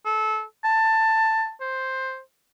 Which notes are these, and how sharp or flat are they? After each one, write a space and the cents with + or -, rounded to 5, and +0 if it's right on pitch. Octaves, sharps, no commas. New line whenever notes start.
A4 -25
A5 +15
C5 +5